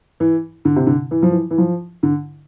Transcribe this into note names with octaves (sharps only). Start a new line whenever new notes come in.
E3
D3
C3
D3
E3
F3
E3
E3
F3
D3